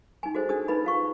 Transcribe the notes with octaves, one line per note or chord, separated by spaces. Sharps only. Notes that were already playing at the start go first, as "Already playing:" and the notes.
D#4 G#5
F#4 G#4 A4 C5 D#5
D4 G#4 A4 D#6
D#4 B4 D#5 B5
F4 F5 C#6